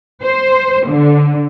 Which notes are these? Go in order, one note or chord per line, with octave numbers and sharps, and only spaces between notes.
C5
D3